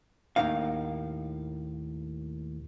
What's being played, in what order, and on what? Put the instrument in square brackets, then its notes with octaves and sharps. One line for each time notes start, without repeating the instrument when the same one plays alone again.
[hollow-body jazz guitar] D#2 A2 D3 A#3 D#4 F5